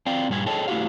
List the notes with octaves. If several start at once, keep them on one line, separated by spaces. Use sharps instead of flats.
C4 D5 F5 G5
G2 A#2 G3 F#4 G#5
G#4 A4 C#5 D#5 G5 A5
A3 E4 F#4 G4 F5